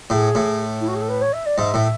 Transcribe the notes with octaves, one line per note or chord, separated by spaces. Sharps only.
A2 G#4
A2
E4
F#4
G#4
A4
B4
C#5
E5
D5
G#2 E5
A2